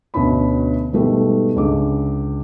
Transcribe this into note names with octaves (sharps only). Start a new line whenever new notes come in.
D2 B2 D3 C#4 B5
G#2 B2 G3 A3
C#2 D3 D6